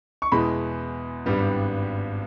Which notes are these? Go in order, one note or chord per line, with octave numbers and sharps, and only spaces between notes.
C#6
E2 B2 G#3 B3 E4 B5
G#1 G2 G3 B3